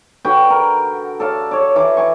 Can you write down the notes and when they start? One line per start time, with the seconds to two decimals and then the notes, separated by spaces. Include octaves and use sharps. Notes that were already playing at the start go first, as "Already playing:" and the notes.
0.25 D3 F#4 B4 G5
0.50 A#4
1.20 A4 D5 F5
1.51 C#5 D5
1.76 E3 D6
1.97 G#5 C#6